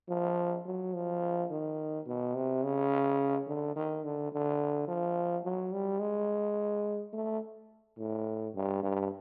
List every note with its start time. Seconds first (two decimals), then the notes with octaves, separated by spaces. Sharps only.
0.09 F3
0.66 F#3
0.94 F3
1.51 D#3
2.07 B2
2.35 C3
2.63 C#3
3.47 D3
3.76 D#3
4.04 D3
4.33 D3
4.88 F3
5.45 F#3
5.73 G3
6.01 G#3
7.13 A3
7.98 A2
8.55 G2
8.83 G2